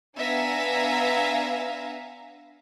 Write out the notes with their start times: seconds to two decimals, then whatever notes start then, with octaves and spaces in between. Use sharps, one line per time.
0.18 B3 D4 E5 F5 G#5 A#5